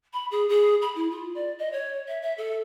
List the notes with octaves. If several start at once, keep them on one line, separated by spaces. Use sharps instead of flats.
B5
G#4
G#4
B5
E4
F4
D5
D#5
C#5
E5
E5
A4